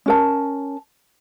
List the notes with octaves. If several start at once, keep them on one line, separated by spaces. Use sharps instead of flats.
C#4 A#4 A5